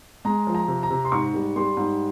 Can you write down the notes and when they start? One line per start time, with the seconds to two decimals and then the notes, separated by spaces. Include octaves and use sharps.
0.25 G#3 A#5
0.47 F3
0.54 A#5
0.68 C3
0.83 A#5
0.90 C3
1.05 C6
1.12 G#2 C#6
1.34 G3
1.56 G3 C6
1.77 G#2